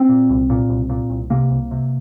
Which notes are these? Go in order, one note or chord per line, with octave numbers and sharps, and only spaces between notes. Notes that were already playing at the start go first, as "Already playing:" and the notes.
Already playing: C4
A#2
C2
A#2
C2
A#2
C2
C3 A#3
C2
C3